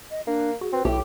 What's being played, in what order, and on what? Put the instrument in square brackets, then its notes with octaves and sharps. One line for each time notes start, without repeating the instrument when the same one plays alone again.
[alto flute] D#5
[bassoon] A#3 [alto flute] D4
[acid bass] F#4 [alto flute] G#4
[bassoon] C4 [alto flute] B4
[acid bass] B1 [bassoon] A2 [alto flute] E4 [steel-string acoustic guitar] G4